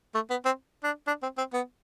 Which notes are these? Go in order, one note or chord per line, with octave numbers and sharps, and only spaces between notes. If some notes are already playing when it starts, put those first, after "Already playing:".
A3
B3
C4
D4
D4
C4
C4
B3